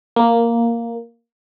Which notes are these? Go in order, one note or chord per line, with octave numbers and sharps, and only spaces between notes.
A#3